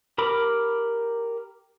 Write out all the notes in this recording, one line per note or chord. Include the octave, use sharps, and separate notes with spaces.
G4 A#4 B5 D6